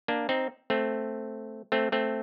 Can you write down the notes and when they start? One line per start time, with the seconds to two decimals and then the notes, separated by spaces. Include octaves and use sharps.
0.08 A#3 D4
0.29 C4 D#4
0.70 A3 C4
1.72 A3 C4
1.92 A3 C4